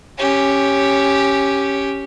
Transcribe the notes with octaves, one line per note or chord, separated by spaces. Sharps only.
C#4 G4